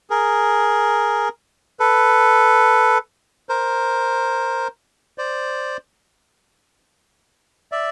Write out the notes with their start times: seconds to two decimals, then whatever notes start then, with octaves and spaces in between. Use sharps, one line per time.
0.10 G#4 A#4
1.80 A4 B4
3.49 A#4 C5
5.18 C5 D5
7.72 D5 E5